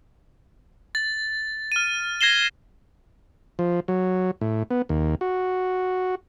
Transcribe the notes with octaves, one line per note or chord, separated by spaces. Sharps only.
A6
F6 D#7
G#6 A#6 C7 E7 G7
F3
F#3
A2
B3
D#2
F#4